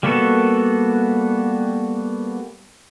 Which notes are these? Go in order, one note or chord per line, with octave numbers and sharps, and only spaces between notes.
G3 A#3 B3 F#4 A4